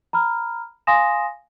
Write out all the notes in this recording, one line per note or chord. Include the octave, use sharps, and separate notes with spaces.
A#5 B5 F6
F5 G#5 C6 D#6 A#6 E7